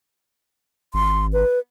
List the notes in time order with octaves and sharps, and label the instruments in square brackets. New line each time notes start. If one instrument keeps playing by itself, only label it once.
[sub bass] G#1 [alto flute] C6
[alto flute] B4